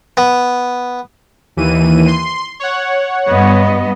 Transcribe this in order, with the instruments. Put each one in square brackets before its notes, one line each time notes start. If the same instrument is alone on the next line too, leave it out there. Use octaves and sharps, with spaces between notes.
[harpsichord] B3
[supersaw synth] D#2 E3 D#7
C6
C#5 F#5
[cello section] G2 B3 D#5